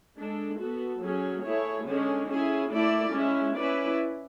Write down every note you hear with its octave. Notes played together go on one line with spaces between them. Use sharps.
G#3 D4 A4
B3 F#4 A4
F#3 C#4 G#4
A3 E4 G#4 C#5
D3 G#3 C#4 G#4
C#4 E4 G#4
A3 E4 A4 D5
G#3 C#4 E4
C#4 E4 B4 D5